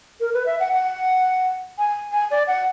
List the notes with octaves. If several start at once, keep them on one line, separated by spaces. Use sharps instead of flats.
A#4
B4
E5
F#5
F#5
G#5
G#5
D5
F#5